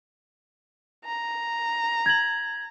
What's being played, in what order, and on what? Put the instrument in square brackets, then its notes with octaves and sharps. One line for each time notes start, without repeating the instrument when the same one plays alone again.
[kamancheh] A#5
[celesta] G#6 F#7